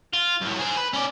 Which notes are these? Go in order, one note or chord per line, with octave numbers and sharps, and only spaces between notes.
F4
F#2 A2
G#4 C5
B4
C#4 D5